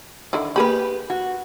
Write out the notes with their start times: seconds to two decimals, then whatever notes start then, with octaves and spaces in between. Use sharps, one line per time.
0.33 D3 D#3 E4
0.56 A#3 G4 G#4 B4 B5
1.10 F#4